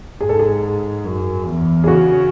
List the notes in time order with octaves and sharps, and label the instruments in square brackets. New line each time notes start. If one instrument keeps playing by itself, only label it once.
[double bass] G#2 [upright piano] G#4
[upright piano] A4
G#4
[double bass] F#2
E2
[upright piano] G#4
[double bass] C#3 [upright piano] F#4